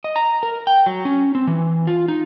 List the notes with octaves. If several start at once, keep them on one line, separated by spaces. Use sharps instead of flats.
D#5
A#5
A#4
G5
F#3
C#4
C4
E3
F4
D#4